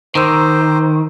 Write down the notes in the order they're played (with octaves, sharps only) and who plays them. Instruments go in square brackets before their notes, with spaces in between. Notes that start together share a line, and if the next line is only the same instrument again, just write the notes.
[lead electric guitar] D#3 [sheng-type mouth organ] C5 [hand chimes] A#5 D6 E6